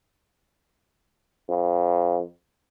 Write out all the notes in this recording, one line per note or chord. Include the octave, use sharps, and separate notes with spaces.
F2